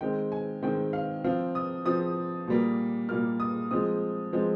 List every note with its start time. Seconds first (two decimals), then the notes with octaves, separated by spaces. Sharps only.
0.01 D#3 G#3 C4 G5
0.32 G#5
0.63 D#3 G#3 C4 G5
0.93 F5
1.24 F3 C4 F5
1.55 D#6
1.85 F3 C4 D#6
2.48 A#2 G3 A#3
3.09 A#2 G3 A#3 F6
3.40 D#6
3.71 F3 G#3 C4 D#6
4.33 F3 G#3 C4